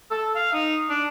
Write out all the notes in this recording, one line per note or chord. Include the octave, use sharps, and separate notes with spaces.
A4
F5
D#4
D4